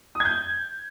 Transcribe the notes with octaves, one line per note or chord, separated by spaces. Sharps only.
D#6
G#6
G6